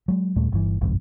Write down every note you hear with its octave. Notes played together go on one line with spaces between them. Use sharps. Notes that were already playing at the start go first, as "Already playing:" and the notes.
F#3 G#3
D#2 A#2 G3 A3
G1 G2 C#3 E3
G1 C2 F2 G#2